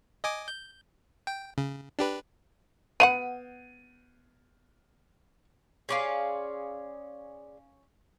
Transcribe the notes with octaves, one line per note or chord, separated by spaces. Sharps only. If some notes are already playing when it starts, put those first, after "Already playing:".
D#5 G#5 D6
G6
G5
C#3
D4 G4 B4
B3 F5 F#5 D#7
C#4 G#4 C#5 D5 F5 C6